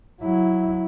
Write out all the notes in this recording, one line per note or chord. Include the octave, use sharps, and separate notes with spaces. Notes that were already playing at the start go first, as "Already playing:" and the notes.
F#3 E4